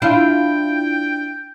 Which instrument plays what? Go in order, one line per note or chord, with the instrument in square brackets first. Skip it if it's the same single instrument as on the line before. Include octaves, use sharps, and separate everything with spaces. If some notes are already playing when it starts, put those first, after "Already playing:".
[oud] D4 E4 F4 [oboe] G5